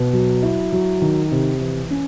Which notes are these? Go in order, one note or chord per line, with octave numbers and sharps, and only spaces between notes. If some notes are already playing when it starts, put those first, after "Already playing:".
Already playing: B2
F#3
E4
F#3
D#3
C3
E3
C#4